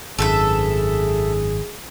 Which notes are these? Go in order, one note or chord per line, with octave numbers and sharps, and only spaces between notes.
G#1 F#2 G#4 A4 B4 E5